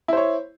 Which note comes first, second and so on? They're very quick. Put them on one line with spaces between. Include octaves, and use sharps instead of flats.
E4 C5 C#5